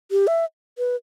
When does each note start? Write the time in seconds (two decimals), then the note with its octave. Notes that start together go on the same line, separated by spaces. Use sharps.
0.11 G4
0.27 E5
0.78 B4